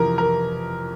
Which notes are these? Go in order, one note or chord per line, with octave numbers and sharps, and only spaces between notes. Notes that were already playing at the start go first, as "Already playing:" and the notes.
Already playing: F2 C3 E3 A#4
A#4